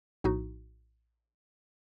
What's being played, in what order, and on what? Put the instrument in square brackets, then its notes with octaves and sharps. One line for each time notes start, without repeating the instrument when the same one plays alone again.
[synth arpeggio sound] A#1 A2 D#4 F#4